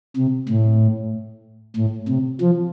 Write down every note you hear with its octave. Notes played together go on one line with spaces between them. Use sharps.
C3
A2
A2
C3
F3